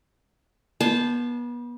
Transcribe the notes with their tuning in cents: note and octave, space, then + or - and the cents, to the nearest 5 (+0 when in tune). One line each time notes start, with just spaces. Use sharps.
B3 -35 C5 +0 A5 -20